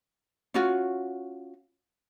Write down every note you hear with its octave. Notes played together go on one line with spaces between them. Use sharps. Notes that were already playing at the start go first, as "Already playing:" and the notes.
C#4 F4 F#4